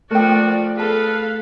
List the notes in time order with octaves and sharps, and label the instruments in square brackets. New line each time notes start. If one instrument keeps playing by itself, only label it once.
[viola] F3 D5 [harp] A3 [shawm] F#4 [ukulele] A#4 G5
[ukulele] G#4 A5 [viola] A4 F5 [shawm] B4